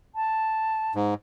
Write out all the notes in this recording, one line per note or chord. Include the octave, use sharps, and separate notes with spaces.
A5
G#2